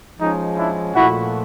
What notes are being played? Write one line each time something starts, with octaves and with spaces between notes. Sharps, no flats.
F3 G#3 C#4 D#4
D4 E4
A#2 F3 A3 E4 F#4